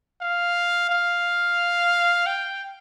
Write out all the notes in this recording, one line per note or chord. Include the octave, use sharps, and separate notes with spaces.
F5
F5
G5